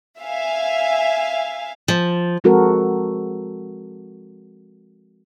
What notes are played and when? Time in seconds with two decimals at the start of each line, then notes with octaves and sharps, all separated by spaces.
0.20 E5 F5 G#5
1.88 F3
2.44 F3 G#3 C4 F#4 A4 A#4